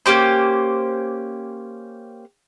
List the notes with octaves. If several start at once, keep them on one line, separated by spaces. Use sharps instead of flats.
A#3 C#4 G4 C5